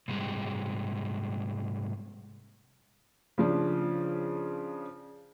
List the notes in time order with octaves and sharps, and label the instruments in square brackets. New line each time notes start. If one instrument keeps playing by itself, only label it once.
[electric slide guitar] G#2 C3 G3 G#3
[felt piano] C#3 F3 D4